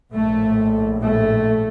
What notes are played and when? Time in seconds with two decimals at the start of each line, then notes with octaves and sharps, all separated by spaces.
0.15 A#1 A2 A3
1.04 A3